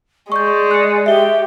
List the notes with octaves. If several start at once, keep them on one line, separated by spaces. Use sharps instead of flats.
G#3 D5 C#6 G6
F#6 C#7
G4 E5 G7